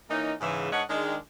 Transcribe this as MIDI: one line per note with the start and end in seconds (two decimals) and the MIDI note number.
0.10 0.34 52
0.10 0.34 58
0.10 0.34 61
0.10 0.34 63
0.41 0.70 44
0.41 0.70 49
0.41 0.70 52
0.71 0.82 44
0.71 0.82 62
0.71 0.82 71
0.71 0.82 73
0.71 0.82 75
0.71 0.82 78
0.89 1.16 51
0.89 1.16 56
0.89 1.16 62